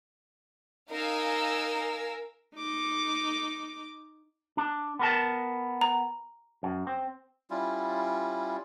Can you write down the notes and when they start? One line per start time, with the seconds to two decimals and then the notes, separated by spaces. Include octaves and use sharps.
0.91 D#4 A#4 F5 G#5 E6
2.56 D#4 D6
4.57 D4
4.99 B3 A#4 A5
5.81 A#5
6.63 F#2
6.87 C4
7.50 G3 C#4 E4 F4